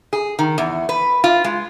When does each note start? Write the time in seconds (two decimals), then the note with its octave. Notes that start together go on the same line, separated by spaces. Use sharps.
0.13 G#4
0.39 D#3
0.58 E2
0.89 B4
1.24 F4
1.44 G#3